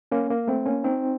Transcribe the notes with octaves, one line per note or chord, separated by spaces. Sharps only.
A#3 C#4
A#3
A3 C4
A#3 C#4
C4 D#4